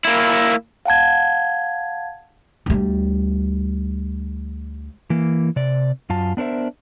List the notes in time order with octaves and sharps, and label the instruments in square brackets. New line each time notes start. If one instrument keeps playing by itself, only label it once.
[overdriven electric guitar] A#3 E4
[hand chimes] F5 F#5 A5 G#6
[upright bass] D2 G3
[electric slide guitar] E3 A#3
C3 D5
F#2 F4 A5
B3 D4 A#4 C5 E5